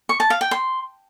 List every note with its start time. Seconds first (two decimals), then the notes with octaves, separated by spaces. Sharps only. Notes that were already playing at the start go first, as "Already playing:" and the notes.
0.09 C#6
0.20 A5
0.30 F5
0.41 G5
0.51 C6